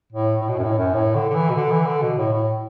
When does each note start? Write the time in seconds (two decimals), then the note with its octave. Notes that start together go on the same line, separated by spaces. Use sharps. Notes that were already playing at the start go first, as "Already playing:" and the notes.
0.12 A2
0.41 A2
0.49 B2
0.58 F#2
0.64 A2
0.78 F#2
0.94 A2
1.15 D3
1.30 D3
1.35 E3
1.50 B2
1.55 D3
1.71 E3
1.86 D3
2.02 B2
2.17 A2
2.32 A2